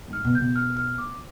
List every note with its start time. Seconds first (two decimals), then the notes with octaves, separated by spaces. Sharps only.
0.08 G#2 F6
0.25 B2
0.35 B2 G6
0.56 F6
0.77 F6
0.98 D6